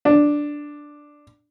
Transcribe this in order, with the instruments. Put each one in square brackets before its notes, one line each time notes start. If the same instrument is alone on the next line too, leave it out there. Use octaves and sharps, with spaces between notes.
[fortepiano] D4